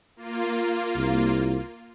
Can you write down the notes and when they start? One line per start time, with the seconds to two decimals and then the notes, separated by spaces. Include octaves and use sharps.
0.16 A#3 F4
0.96 C2